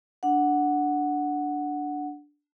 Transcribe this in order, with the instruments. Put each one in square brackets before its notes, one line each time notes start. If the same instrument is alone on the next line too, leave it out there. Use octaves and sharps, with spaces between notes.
[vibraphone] D4 F#5